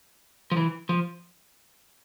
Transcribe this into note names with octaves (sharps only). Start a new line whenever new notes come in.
F3
E3
F3